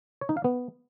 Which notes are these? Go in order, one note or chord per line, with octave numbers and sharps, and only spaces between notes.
C#5
D#4
F5
B3